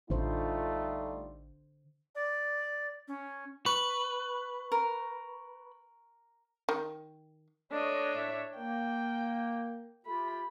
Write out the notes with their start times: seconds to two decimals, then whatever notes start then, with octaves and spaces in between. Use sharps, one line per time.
0.10 A1 D3 G3 A3 D#4 F4 C5
2.15 D5
3.08 C#4
3.66 B4 C#6
4.72 A#4
6.69 D#3
7.72 A3 D4 C#5 D#5
8.16 A2 E5
8.57 A#3 G5
10.06 A3 F4 G4 B5